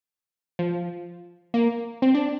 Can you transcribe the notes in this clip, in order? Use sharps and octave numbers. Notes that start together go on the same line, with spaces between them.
F3
A#3
C4
D4